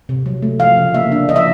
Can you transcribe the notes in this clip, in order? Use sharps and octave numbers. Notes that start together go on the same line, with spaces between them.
C3
F#3
A3
F3 F5
C#3
A#3 E5
D4
F3 D#5
E5